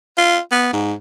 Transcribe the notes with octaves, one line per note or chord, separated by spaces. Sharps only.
F4
B3
G#2